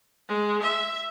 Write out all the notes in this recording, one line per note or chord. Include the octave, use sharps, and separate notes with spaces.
G#3
E5